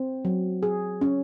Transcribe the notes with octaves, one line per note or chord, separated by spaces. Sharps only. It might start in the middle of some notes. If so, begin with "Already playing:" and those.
Already playing: C4
F#3
G#4
C#4